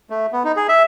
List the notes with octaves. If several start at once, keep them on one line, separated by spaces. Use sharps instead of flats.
A3
B3
D#4
G#4
E5